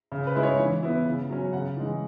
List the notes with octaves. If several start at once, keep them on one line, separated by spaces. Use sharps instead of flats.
C#3
B4
G#3 E4
C#5
E3
B3 E4
C#3
F#3 C#4
C#3 F#5
E3 G#3